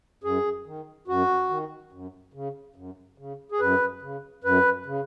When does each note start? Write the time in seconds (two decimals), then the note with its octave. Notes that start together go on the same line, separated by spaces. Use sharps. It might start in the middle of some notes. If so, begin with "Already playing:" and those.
0.24 F#2 G#4
0.66 D#3
1.08 F#2 F#4
1.50 D#3
1.92 F#2
2.33 C#3
2.76 F#2
3.18 C#3
3.52 G#4
3.60 F#2 B4
4.02 C#3
4.44 F#2 B4
4.86 C#3